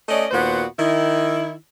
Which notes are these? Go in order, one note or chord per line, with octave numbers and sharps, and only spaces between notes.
A3 C#4 D5 D#5
D#2 A#2 B3 F#4 C5
D#3 E4